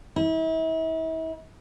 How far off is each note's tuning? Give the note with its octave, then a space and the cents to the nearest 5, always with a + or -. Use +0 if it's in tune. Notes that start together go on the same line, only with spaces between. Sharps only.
E4 -40